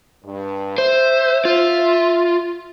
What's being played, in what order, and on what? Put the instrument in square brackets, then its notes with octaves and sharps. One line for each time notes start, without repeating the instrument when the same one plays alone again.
[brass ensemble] G2
[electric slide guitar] C5 [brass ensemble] E5
[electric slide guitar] F4